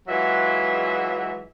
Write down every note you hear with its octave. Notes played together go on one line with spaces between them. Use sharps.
E3 F#3 G#3 F4 E5